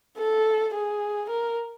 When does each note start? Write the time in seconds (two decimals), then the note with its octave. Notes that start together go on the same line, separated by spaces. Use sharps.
0.18 A4
0.74 G#4
1.30 A#4